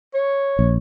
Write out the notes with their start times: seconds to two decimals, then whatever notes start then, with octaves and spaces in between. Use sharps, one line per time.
0.14 C#5
0.59 A#1